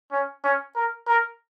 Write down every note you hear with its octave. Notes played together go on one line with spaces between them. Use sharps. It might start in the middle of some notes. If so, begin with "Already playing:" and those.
C#4
C#4
A#4
A#4